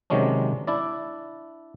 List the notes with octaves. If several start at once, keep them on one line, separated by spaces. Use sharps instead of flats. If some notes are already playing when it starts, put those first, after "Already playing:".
C3 D#3 F#3 G#3 C#4 D4
D4 E4 D5